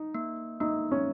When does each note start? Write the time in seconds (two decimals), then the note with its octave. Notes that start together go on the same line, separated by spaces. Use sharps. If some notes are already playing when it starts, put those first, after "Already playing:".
Already playing: D#4
0.15 A#3
0.61 A#3 D#4
0.91 C#4